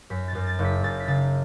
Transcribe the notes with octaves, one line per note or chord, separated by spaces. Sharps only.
F#2 B6
A6
F#2
A6
F#1
B6
F#2 A6
B6
C#3 A6